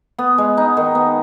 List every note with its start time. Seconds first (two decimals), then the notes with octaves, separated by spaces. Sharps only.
0.19 B3
0.38 G#3
0.57 D#4
0.77 D#3
0.95 B3